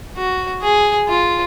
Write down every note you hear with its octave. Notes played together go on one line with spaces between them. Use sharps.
F#4
G#4
F4